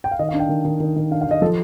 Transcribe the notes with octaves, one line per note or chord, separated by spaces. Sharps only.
G5
F5
D#3 D#5
F5
D4
G5
D#3
D#3
D#3
D#3
D4 F5
F5
D#3 D#5
F3 A4